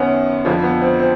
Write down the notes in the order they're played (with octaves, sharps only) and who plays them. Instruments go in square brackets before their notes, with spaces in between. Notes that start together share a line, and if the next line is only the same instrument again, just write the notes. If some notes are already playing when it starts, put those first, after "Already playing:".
Already playing: [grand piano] F#2 D#3 B3 C#4
F2 D3 F3
B3
C4
C4